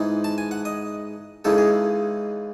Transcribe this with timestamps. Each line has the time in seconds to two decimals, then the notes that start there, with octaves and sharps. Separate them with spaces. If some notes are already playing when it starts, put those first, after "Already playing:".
Already playing: G#2 E3 G#3 D#4
0.24 A5
0.38 G#5
0.51 F#5
0.65 D#5
1.45 C#2 C#3 E3 G#3 D#4 A4
1.58 G#4